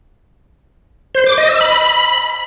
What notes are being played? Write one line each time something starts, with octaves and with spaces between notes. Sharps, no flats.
C5
D6
D#5
E6
B5